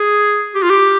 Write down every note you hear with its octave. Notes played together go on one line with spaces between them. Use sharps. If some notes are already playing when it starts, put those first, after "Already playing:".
Already playing: G#4
G4
F4
G4